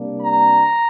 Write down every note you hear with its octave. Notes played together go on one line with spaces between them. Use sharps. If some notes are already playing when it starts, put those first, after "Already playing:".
Already playing: C3 G3 A#3 D4
A#5